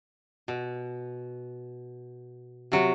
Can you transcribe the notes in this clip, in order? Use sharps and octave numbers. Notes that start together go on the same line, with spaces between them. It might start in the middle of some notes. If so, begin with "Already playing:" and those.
B2
C3 F#3